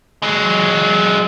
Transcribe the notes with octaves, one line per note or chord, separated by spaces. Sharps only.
F#3 G#3